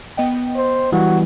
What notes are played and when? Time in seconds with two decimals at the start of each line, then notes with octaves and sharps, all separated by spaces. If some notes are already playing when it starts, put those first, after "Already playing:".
0.17 B3 D#5 G5
0.56 C5
0.92 E3 G3 F#4